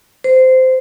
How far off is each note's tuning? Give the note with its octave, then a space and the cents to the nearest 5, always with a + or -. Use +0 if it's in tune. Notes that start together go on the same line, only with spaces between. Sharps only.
C5 -15